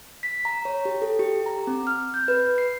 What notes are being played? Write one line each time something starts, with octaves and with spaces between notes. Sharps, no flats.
B6
A#5
C#5
G4
A4
G4
A#5
C4
F6
G6
B4
C7